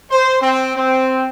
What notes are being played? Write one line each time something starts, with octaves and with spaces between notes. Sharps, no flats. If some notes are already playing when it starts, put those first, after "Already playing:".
C5
C4
C4